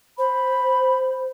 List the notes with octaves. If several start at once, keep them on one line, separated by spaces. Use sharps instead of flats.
C5 B5